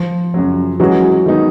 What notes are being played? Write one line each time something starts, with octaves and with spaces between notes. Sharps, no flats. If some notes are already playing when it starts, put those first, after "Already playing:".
Already playing: F3
F#2 C#3 F#3
E3 F#3 G#3 C#4 F#4
D#3 G#3 B3 D#4